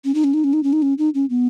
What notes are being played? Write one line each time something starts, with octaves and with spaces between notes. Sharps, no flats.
C#4
D#4
C#4
D#4
C#4
D#4
C#4
D#4
C#4
D#4
C#4
B3